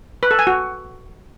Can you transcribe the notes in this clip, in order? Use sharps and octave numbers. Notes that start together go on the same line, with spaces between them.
B4
A4
G#5
F#4